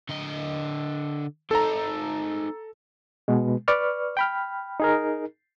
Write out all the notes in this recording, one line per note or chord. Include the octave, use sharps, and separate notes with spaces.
D3 D#5
C4 D#4 A4 A#5
B2 G#3
B4 D5 C#6 F6
G5 B5 F6
D#4 G#4 A#4